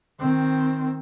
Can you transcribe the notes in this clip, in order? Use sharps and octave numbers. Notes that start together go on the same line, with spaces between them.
D#3 C4